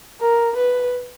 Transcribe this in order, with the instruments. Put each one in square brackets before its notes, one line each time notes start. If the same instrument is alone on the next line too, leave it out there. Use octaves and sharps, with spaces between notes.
[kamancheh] A#4
B4